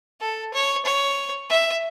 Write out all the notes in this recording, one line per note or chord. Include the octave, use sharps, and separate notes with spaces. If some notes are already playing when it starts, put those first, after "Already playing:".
A4
C#5
C#5
E5